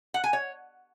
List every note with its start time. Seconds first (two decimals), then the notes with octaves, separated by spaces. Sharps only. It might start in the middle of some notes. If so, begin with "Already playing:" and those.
0.14 F#5
0.24 G#5
0.33 C#5